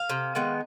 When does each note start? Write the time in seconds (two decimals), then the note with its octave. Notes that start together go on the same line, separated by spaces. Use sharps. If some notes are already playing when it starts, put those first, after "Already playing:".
Already playing: F5
0.10 C3
0.35 D#3 G#3 B3